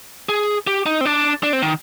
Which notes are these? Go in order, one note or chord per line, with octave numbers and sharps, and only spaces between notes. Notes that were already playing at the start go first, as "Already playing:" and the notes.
G#4
G4
D#4
C4
D4
D4
C4
D#3